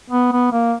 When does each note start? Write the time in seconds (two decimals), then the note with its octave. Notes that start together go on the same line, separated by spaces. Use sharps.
0.10 B3
0.32 B3
0.52 A#3